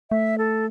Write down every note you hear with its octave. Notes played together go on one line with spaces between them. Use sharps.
A3 E5
A4